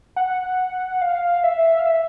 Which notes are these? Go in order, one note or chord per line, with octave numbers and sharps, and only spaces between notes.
F#5
F5
E5
F5
E5